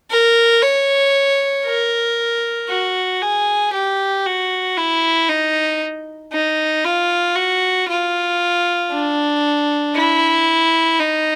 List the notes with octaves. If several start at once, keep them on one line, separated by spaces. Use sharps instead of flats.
A#4
C#5
A#4
F#4
G#4
G4
F#4
E4
D#4
D#4
F4
F#4
F4
D4
E4
D#4